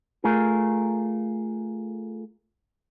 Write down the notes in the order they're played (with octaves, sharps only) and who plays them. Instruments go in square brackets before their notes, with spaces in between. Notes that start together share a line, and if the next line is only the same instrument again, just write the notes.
[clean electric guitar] A3 F4 G#4 A#4